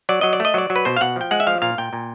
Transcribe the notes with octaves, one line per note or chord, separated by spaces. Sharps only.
F#3 D5
F#3 D#5
D5
A3 D#5
F#3 D5
F#3
B4
B2 C5
F5
B2 F#5
F3 G5
G#3 F#5
E5
F3 F5
A#2 F5
A#2 G5
A#2